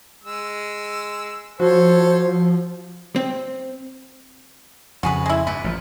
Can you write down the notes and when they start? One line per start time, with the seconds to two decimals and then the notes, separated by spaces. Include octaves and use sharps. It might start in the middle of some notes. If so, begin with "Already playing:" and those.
0.24 G#3 E6
1.59 F3 F#4 A4 C5 C#5 C6
3.16 C4
5.03 F2 C#3 F#4 G#4 B4
5.26 G#3 E4
5.47 G2 B4
5.64 A1 F3